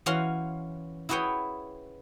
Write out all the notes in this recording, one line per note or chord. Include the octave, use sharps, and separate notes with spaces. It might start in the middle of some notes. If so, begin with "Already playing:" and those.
E3 C#4 F#4 F5 C6
E4 F#4 G#4 B4 C#5 G5